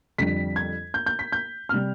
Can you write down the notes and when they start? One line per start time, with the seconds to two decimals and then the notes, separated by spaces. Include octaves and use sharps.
0.18 F2 D3 G3 B6
0.56 G#6
0.94 G6
1.06 G6
1.19 B6
1.32 G6
1.69 C3 G3 F6